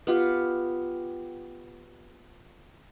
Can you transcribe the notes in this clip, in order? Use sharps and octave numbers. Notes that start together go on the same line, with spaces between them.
B3 F4 G4